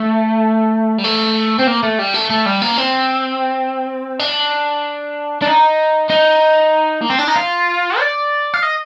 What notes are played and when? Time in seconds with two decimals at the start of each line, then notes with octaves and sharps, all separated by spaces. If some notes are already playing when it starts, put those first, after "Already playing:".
Already playing: A3
0.98 G3
1.04 A3
1.59 C4
1.67 A#3
1.83 A3
1.99 G3
2.14 A3
2.30 A3
2.46 G3
2.62 A#3
2.78 C4
4.20 D4
5.42 D4
5.46 D#4
6.10 D#4
7.01 A#3
7.10 C4
7.19 D4
7.27 D#4
7.36 F4
7.99 D5
8.54 F5
8.63 D#5